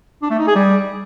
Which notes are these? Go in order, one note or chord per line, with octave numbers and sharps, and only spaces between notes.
D4
A3
D#4
G#4
G3